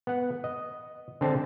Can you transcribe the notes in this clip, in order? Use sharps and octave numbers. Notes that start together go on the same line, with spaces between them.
B3 F#5
D#5
D3 C4 A5